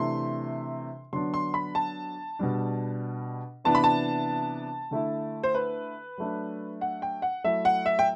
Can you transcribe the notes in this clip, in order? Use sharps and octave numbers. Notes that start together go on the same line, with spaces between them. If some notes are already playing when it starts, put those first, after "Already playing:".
Already playing: C3 E3 A3 D4 C6
D3 F#3 B3 D4 C6
C6
B5
A5
B2 G3 D4
C3 E3 B3 D4 A5
B5
A5
D3 A3 E4
C5
B4
F#3 A3 D4
F#5
G5
F#5
F#3 A3 E4 E5
F#5
E5
G5